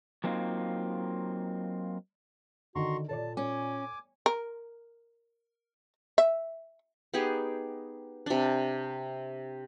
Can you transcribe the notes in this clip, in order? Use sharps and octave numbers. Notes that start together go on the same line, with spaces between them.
F#3 A#3 C4 D#4 F4
D3 D#3 F#4 A#5 C6 C#6
A#2 A4 C#5 D5 A5
C#4 G#5 D6
A#4
E5
B3 D#4 G4 G#4
C3 D4